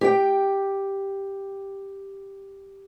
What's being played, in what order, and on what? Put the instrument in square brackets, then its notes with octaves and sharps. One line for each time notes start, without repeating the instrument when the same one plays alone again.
[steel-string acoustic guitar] G4 G5